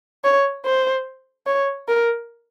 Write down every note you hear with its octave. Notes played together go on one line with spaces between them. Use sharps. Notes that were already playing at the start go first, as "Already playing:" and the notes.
C#5
C5
C#5
A#4